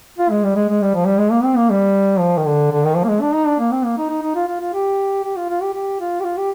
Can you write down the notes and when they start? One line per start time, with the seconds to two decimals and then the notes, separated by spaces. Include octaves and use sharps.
0.18 F4
0.30 G#3
0.43 G3
0.56 G#3
0.69 G#3
0.81 G3
0.94 F3
1.06 G3
1.18 G#3
1.31 A#3
1.44 C4
1.56 A#3
1.70 G3
2.19 F3
2.37 D#3
2.46 D3
2.71 D3
2.84 D#3
2.96 F3
3.04 A#3
3.08 G#3
3.21 D4
3.33 D#4
3.46 D4
3.59 A#3
3.71 C4
3.84 A#3
3.98 D#4
4.09 D#4
4.22 D#4
4.35 F4
4.48 F4
4.60 F4
4.73 G4
5.23 G4
5.36 F4
5.49 F4
5.62 G4
5.74 G4
6.00 F4
6.20 G4
6.24 F4
6.37 G4